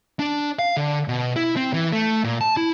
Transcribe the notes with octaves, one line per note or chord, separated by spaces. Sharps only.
D4
F5
D3
B2
E4
C4
E3
A3
A#2
A5
E4